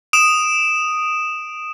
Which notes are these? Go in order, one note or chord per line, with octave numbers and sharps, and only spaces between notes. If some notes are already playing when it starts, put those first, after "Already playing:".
D#6 D7 E7